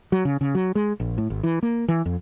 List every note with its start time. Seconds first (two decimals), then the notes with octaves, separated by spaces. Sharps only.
0.12 F#3
0.25 C#3
0.41 C#3
0.55 F#3
0.75 G#3
1.00 A#1
1.18 A2
1.30 G#1
1.43 E3
1.63 A#3
1.88 E3
2.06 F2